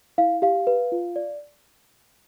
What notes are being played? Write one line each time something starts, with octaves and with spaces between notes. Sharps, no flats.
E4 F5
G4 F5
B4
F4
D5